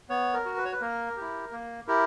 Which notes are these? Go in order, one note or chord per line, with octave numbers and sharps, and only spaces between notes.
B3 C#5
A#4
F#4
B4
C#5
B4
A#3 A#4
E4 G4
A#3
E4 G4 A#4